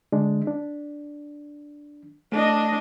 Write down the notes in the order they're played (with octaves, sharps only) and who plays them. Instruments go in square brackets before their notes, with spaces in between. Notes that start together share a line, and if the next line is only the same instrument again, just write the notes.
[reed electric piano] D3 G#3 D4
D4
[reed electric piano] A3 [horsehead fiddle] D4 D#5